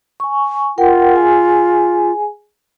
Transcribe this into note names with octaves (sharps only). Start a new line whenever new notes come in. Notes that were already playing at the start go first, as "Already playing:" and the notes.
G#5 C#6
F4 A#4 F#5 G5
G#4 G#5